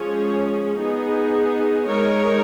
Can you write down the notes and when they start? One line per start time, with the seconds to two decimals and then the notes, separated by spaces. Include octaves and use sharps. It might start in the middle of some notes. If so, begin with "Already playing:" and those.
Already playing: F3 G#3 C#4 G#4 C#5
0.79 B3 D#4 G#4
1.87 G#3 D#4 A#4 C#5